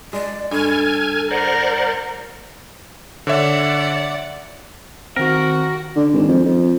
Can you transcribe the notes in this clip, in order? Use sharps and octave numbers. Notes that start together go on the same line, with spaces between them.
G#3 D5
G2 A4 G#5 F6 G#6
A#4 C5 D5 F#5
D3 C#5 D5 E5 F#5
D#3 C4 F#4 A#4
D3
G#1
F2
F2